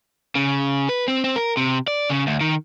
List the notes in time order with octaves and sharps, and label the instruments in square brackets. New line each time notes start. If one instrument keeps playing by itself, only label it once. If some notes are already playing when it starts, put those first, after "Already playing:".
[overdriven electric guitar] C#3
B4
C4
C4
A#4
C3
D5
C#3
D2
D#3